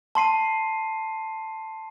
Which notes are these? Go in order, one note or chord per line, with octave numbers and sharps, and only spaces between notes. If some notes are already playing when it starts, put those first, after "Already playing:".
A5 C6 C7 D#7